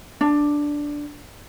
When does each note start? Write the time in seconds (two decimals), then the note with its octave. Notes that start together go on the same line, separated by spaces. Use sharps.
0.21 D4